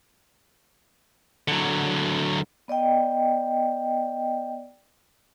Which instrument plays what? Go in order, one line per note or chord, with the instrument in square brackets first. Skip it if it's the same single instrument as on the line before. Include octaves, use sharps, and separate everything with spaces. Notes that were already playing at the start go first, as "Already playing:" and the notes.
[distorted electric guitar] D3 F#3
[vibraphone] B3 D5 D#5 G5